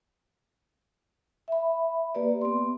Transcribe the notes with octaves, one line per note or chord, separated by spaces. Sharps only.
E5 B5
A#3 G4 B4 D5
B3 C6